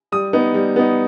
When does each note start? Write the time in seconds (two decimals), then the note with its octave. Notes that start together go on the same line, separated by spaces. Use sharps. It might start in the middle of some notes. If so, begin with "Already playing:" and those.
0.12 G3 D#6
0.33 B3 D#4
0.54 G3
0.76 B3 D#4